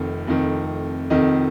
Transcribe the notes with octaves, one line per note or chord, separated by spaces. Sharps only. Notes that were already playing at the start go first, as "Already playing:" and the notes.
Already playing: F1 F2 D#3
F1 F2 D#3
F1 F2 D#3 D#5